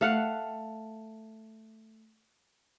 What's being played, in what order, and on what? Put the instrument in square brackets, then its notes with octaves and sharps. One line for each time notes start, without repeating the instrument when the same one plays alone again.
[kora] A3 F5 F#5